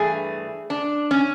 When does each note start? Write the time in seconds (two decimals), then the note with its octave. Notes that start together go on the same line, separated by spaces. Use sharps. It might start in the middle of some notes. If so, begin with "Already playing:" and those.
Already playing: G2 E3 A3 G#4
0.70 D4
1.11 C#4